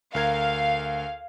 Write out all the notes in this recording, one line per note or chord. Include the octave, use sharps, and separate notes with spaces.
D2 A#4 F5 G#6